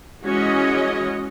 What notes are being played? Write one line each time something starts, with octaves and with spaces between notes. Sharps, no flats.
E3 G#3 C#4 F#4 C#5 D#5